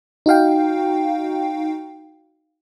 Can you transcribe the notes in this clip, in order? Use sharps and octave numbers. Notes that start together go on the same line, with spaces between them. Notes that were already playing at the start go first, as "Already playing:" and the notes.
D#4 F#4 F5 G5